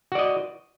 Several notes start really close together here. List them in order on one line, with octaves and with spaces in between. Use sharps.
F#4 D5 D#5